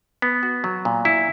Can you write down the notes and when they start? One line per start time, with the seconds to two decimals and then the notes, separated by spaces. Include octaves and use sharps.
0.22 B3
0.43 F#4
0.64 F#3
0.85 A#2
1.05 E4